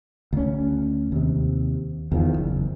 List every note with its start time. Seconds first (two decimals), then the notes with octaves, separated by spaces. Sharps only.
0.33 D2 C#4
1.12 D#2 C3
2.12 E2 D#3 F3
2.38 F#1